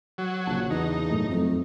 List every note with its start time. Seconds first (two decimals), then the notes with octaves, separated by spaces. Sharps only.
0.18 F#3
0.47 A#1 C#3 A5
0.70 E2 D#4
1.11 F#2 A2 A3
1.30 F2 F#3 A3